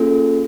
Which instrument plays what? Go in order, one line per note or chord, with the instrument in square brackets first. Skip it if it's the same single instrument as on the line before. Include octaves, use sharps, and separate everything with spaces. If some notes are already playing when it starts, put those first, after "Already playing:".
Already playing: [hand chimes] A#3 C#4 F4 G#4 A4